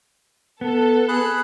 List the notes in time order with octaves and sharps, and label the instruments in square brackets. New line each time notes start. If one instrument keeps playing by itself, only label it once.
[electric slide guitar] B3 [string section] A4
[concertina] G#4 B5 F#6